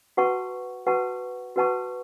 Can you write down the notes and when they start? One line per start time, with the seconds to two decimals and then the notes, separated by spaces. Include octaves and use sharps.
0.17 F#4 B4 F#5 A5 C#6
0.86 F#4 B4 F#5 A5 C#6
1.56 F#4 B4 F#5 A5 C#6